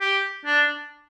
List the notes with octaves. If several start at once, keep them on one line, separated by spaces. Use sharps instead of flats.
G4
D4